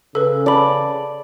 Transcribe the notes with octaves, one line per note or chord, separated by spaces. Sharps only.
C#3 A4 B4
D5 A5 B5